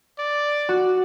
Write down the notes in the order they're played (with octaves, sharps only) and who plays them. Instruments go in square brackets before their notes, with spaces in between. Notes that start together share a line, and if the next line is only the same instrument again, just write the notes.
[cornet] D5
[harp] F#4